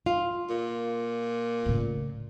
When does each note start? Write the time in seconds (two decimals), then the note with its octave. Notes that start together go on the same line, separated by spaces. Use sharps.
0.06 F4
0.50 A#2
1.66 A2 C#3